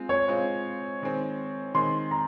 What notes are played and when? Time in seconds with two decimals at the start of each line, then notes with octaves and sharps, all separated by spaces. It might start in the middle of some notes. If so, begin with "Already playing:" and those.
Already playing: G#3 C4 F4
0.09 C#5
0.28 G#3 C4 F4
1.02 D#3 G#3 C4
1.74 D#3 G#3 C4 C6
2.11 A#5